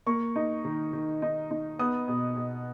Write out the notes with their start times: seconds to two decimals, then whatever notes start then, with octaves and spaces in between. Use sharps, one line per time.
0.06 A#3 C#6
0.36 D#4
0.65 D#3
0.93 D#3
1.22 D#4
1.51 D#4
1.79 B3 D#6
2.08 B2
2.37 B2